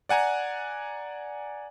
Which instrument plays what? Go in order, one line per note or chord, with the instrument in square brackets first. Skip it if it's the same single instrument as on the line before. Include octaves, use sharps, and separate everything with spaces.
[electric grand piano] D5 F#5 G#5 A#5 F#6